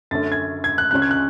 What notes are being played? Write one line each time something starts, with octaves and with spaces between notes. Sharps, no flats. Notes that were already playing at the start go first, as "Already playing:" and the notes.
F#2 D3 A3 C#4 A6
G#6
G#6
F#6
C#2 C#3 G#3 C#4 F#6
G#6
F#6